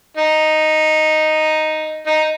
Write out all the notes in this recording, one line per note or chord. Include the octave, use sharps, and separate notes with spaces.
D#4
D#4